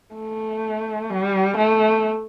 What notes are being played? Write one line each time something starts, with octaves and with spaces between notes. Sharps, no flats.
A3
G3
A3